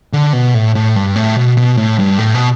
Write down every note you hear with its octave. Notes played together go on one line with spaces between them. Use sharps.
D3
B2
A2
A2
G2
A2
B2
B2
A2
G2
A2
B2